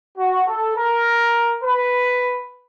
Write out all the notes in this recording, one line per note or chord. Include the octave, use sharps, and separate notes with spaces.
F#4
A4
A#4
B4